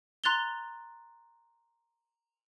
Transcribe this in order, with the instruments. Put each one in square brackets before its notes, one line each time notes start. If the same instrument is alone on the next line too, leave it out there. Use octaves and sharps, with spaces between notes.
[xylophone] A#5 C6 F#6 A6 F7 G7